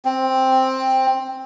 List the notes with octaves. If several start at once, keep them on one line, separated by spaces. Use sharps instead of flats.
C4